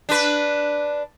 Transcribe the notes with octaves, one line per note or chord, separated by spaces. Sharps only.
D4 B4